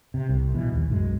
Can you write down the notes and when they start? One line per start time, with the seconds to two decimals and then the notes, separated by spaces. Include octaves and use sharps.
0.14 C3
0.29 C2
0.54 A#1 B2 E3
0.72 D#2
0.90 B1 F#2 G#3